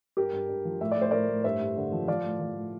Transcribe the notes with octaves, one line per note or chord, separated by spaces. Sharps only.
G2 G4 A#4
G2
G2
F3
A2 E5
D5
A2 C5
A2 A#4 D5
A2
G2 C5 E5
G2
D3
F3
F3 D5 F5
A2
F3
A2